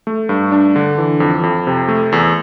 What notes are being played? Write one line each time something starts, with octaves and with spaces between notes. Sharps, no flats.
A3
G2
D4
D3
E3
F2
F2
C3
A3
E2